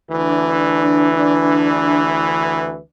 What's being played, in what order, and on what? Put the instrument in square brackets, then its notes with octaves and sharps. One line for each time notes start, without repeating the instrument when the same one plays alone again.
[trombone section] D2 E3 [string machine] D4